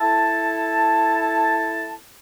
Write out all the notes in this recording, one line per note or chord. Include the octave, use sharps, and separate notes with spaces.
E4 A4 A5